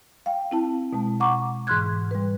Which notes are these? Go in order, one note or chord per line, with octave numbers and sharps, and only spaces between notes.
F5 G5
C4 E4 A5
B2 G#3 A5
F#5 A#5 C#6 D6
G#2 E3 C6 F6 F#6 G#6
G3 B4